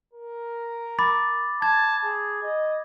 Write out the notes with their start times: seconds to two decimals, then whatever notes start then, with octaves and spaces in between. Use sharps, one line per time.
0.14 A#4
0.99 B5 D6 A6
1.62 A5 G#6
2.05 G#4
2.43 D#5